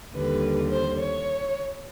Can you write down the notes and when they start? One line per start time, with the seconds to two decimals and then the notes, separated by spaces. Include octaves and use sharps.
0.14 D#2 D3 G3 B4
0.71 C5
0.99 C#5